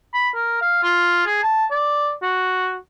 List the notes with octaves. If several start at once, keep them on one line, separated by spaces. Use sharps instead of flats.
B5
A#4
F5
F4
G#4
A5
D5
F#4